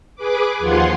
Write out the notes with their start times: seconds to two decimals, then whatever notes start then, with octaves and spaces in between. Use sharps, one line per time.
0.15 G#4 B4 D6
0.58 D#2 F3 F4 F#5 G#5 C6